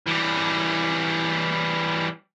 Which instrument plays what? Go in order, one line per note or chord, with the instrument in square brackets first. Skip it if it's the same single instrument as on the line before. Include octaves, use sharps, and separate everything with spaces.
[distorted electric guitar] E3 G3